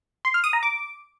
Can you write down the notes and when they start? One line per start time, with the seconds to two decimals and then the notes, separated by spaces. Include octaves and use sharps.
0.25 C6
0.34 F6
0.44 D#6
0.53 A#5
0.63 D6